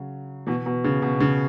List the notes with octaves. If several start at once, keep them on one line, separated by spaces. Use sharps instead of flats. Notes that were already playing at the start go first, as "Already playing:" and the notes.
Already playing: C#3 F#3
B2 E3
B2
C#3
B2
C#3